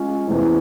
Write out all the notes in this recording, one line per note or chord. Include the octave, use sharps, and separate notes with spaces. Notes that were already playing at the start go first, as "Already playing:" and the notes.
Already playing: G#3 C#4 F4
E2 C3 E3 A3 C#4